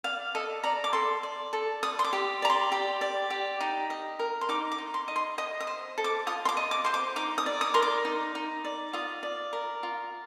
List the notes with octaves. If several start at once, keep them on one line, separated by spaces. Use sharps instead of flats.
D5 F5
A4 D#5
D5 A#5
D6
A4 C6
D5
A4
D5 D#6
C6
D6
G4
D5 A#5
C6
G4
D5
G4
D#4
D#5
A#4
C6
D#4 D6
D6
D#4
C6
D#5
C6
D#5 D#6
D#6
C5
A4
D6
F4 D#6
C6
D6
D#5
D6
C5 C6
D6
D#4 D6
D#6
D5
D#6
A#4 C6
D6
D#4
D#4
D5
F4 D#6
D5
A#4
F4